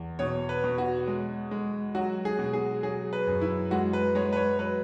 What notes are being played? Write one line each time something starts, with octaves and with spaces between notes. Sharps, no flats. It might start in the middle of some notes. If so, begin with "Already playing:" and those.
Already playing: E2
B2 C#5
B4
B2
F#4
G#3
G#3
F#3 F#4
G#4
B2
G#4
F#3 G#4
B4
F#2
E4
G#3 F#4
B4
G#3 C#5
B4
C#5
F#3 B4